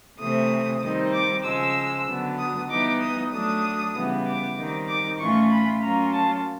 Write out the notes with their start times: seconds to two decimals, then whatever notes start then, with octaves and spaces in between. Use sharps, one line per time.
0.19 C3 E3 A3 C4 D#6
0.81 D#3 G3 C4 D#4
1.13 D6
1.44 C#3 F3 G#3 E6
2.07 D3 F#3 B3
2.38 D#6
2.69 E3 G3 B3 D#4 D6
3.01 D#6
3.31 F#3 A3 D4 D#6
3.94 C#3 E3 G3 B3
4.25 D6
4.56 D#3 G3 C4 D#4
4.87 D6
5.19 A2 E3 A3 C#4 F4 C#6
5.50 B5
5.82 F#3 A#3 C#4 F4 A#5
6.12 A5